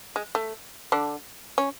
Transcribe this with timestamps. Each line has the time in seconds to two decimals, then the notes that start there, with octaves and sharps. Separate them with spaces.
0.16 G#3
0.35 A3
0.92 D3 D4
1.58 C#4